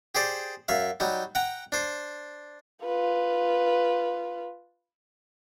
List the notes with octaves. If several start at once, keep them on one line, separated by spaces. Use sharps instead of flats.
G4 G#4 C5 D5
F#2 E5 F5
F#3 G3 D#4
F#5 G5 A#5
D4 C5
F4 B4